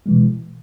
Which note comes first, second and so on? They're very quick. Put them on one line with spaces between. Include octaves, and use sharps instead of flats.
G#3 E3 B2